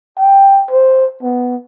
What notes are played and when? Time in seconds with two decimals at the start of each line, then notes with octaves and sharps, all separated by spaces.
0.19 G5
0.71 C5
1.22 B3